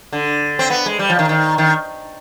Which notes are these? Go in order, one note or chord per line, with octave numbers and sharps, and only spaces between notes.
D3
C4
B3
G#3
G3
F3
D#3
D#3
D#3